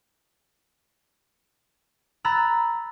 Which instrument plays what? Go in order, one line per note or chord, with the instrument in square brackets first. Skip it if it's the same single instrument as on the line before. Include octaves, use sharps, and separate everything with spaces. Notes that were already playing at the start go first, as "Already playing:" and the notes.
[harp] A#5 B5 E6 F#6 A6